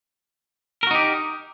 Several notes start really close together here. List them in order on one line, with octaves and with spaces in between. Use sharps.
A#4 F#4 D#4 G4